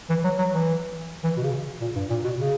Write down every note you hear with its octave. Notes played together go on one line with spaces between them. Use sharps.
E3
F#3
F#3
E3
E3
B2
C#3
A#2
G2
A#2
B2
C#3